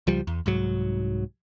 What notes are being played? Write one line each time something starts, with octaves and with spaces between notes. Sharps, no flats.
C#2 F3 G3
E2
C2 G#2 F#3